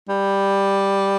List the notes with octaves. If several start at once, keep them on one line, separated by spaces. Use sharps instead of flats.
G3